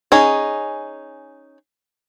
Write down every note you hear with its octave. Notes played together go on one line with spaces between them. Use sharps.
C#4 D#4 G#4